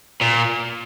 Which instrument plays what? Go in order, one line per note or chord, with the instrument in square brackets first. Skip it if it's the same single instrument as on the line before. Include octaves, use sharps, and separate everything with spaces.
[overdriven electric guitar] A#2